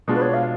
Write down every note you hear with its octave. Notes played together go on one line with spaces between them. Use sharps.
B2 G#3 D4 F4
B4
C#5
F5